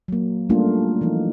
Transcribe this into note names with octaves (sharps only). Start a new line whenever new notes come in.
F#3 A#3
G3 A3 A#3 C#4 D4 F4
E3 F3 D#4